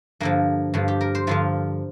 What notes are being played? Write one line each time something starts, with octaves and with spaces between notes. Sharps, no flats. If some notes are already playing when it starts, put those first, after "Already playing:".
G2 D3 F3 A#3
G2 D3 F3
G4
A#4
C5
G2 D3 F3 F4